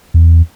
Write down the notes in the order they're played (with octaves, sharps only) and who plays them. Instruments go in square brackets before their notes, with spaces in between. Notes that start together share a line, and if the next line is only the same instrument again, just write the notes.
[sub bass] E2